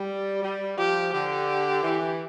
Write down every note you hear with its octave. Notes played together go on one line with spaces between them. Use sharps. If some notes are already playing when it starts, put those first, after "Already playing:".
Already playing: G3
G3
F3 G4
D3 G4
E3